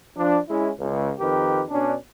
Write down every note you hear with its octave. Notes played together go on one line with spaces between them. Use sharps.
F3 D4
G#3 C#4 E4
C#2
F2 D#3 G4 A#4 B4
B2 C#4 D4